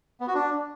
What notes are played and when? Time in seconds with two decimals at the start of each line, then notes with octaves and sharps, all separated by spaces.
0.21 B3
0.28 F#4
0.35 D4